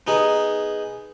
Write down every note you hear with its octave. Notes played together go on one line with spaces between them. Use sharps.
B3 D#4 G#4